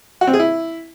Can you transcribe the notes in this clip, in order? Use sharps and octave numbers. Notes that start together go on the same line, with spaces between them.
F#4
C4
G#4
E4